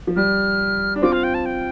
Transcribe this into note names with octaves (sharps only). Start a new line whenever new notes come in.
F3
G3 F6
D4
C4 F4 D6
F5
G5
A5
G5